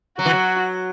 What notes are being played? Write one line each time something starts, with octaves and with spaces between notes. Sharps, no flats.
F#3 F#4
E3
F#3